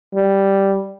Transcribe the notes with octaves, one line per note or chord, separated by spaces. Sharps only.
G3